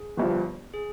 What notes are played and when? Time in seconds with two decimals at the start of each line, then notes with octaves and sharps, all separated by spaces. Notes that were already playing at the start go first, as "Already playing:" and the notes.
Already playing: G#4
0.17 G1 G2 F3
0.74 G#4